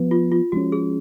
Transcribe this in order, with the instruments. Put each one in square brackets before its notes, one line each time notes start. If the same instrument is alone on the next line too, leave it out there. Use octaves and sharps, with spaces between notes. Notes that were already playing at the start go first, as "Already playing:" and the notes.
Already playing: [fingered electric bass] F3 B3
[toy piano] F4
F4
[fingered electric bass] F3 G#3 C#4 [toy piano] F#4
[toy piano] G#4